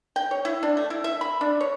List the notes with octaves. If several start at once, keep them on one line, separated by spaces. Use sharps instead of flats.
G5
C#5
E4
D4
A3
E4
E5
B5
D4
C#5